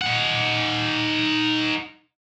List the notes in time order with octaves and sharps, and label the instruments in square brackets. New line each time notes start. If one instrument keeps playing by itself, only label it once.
[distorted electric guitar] D#4 F#5